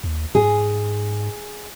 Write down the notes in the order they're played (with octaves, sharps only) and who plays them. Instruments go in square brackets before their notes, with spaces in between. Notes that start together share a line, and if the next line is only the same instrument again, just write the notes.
[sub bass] D#2
[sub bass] G#2 [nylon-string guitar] G#4